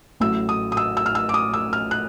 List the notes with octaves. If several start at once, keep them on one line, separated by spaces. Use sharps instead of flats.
A1 A2 F#3 E6
D#6
D#6
E6
E6
F6
E6
D6
D#6
E6
F6
F#6